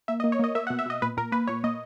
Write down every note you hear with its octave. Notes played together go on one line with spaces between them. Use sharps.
A#3 E5
D#5
A#3
C#5
A#3 D#5
A#3 E5
F#5
B2
E5
B2 D#5
A#2 B4
A#2 A#4
A#3 B4
A#2 C#5
A#3 D#5